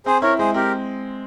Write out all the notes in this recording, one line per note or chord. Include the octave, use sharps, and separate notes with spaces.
C4 G#4 C5
E4 A#4 C#5
G#3 G#4 C5
C4 G4 A#4